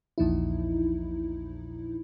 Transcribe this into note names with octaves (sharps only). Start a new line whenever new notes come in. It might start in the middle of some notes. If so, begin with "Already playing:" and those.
A#1 E2 A#2 F3 D#4 E4